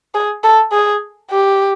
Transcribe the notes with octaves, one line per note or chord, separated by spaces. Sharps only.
G#4
A4
G#4
G4